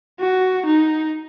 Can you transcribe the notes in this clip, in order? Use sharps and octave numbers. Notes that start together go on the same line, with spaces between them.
F#4
D#4